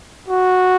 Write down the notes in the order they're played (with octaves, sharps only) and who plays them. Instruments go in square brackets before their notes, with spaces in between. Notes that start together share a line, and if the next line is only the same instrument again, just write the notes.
[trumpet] F#4